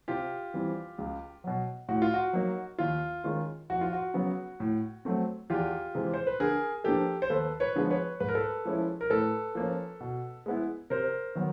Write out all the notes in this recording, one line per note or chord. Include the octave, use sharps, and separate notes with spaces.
C3 F4 G4
E3 G3 C4
C#2
B2 F#3
A2 F#4
F4
F#4
F#3 A#3 D#4
D#2 F4
D#3 G#3 C#4 F4
F2 F#4
F4
F#4
C#3 F#3 B3
A2
F#3 A3 C4
E2 F4 G4
C3 E3 G#3 C4
C5
B4
D3 G#4 A#4
F3 A#3 D4 G4 A4
C5
D#2 A4 B4
B4 C#5
D3 F3 G#3 B3
B4 C#5
G#2 B4
A#4
A4 B4
F3 G#3 C#4 E4
A#4
A2 A4 B4
F3 A#3 C#4
B2
G#3 B3 E4
C3 A#4 C5
D#3 F#3 B3